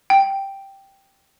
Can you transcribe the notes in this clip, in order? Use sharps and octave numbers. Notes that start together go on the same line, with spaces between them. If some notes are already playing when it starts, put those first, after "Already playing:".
G5